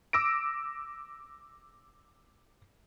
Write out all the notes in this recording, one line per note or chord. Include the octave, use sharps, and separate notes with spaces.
D6 E6 A#6 D7